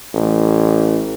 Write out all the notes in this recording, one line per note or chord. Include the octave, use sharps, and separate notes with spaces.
A1